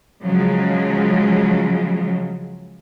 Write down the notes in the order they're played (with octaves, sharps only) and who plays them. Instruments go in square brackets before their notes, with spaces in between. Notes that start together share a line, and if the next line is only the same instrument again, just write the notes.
[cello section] C#3 F3 F#3 G#3